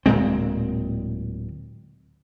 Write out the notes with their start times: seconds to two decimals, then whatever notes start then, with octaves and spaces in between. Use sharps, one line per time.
0.06 D1 A#2 G#3 C4